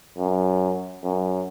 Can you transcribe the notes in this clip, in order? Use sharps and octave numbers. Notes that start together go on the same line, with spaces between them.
F#2
F#2